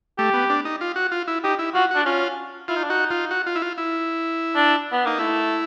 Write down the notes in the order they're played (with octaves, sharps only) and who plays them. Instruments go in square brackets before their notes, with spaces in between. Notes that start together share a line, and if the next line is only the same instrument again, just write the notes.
[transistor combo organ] A3 [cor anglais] G4
[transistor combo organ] B3
D4
D#4
F4
F#4
F4
E4
[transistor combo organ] D#4 [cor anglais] G4
[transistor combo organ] E4
[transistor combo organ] F4 [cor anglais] F#4
[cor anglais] D4 [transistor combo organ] F#4
[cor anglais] C#4 [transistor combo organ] F4
[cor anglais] E4 [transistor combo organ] F4
[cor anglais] D#4
D4
[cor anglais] D#4 [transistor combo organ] F#4
[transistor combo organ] F4
F#4
F4
E4
F4
E4
[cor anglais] D4
B3
[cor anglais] A#3 [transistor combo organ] D#4
[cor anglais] A3 [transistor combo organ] E4